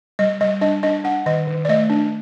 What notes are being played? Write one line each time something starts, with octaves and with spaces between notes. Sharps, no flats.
G3 D#5
G3 D#5
D4 D#5
D4 D#5
D4 F#5
D#3 D#5
D#3
D5
A3 D#5
D4